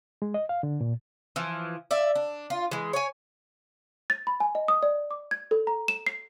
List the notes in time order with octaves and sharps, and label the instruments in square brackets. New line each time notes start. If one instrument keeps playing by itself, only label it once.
[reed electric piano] G#3
D#5
F5
D3
A#2
[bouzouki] E3 F3
D5 E5
D4
F4
E3 G#3
C#5 G#5
[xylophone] A6
B5
G#5
D#5
D#6
D5
D6
G#6
A4
A#5
E7
C7